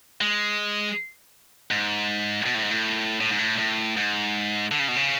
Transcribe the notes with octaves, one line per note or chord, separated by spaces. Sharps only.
G#3
G#2
B2
A2
G#2
A2
A2
G#2
A2
A2
G#2
D3
C#3
B2
C#3